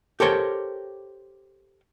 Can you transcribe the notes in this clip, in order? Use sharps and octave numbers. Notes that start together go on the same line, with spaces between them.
G4 A4 A#4 C5 C#5 G5